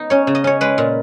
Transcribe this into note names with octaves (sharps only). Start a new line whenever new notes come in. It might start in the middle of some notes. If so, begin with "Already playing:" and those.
Already playing: B3 D#4
C#4 C#5
C#3
D#5
C#4 C#5
G#3 B4
A#2